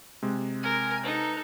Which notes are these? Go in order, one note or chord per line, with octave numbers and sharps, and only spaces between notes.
C3 G#3
A#4 G#5 F6 G#6
D#4 A4 B4 A#5